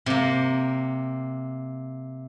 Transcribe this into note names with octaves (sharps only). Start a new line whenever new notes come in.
C3 A#3